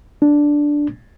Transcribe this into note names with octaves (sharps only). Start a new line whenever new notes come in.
D4